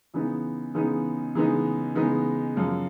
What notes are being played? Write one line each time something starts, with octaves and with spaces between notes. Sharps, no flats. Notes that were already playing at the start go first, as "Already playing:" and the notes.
C#3 E3 G#3 B3 D#4
C#3 E3 G#3 B3 D#4
C#3 E3 G#3 B3 D#4
C#3 E3 G#3 B3 D#4
F#2 C#3 F3